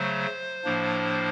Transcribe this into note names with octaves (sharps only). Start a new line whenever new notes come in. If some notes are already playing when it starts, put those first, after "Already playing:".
Already playing: C#3 F#3 A3 C5
A2 F3 A#3 D4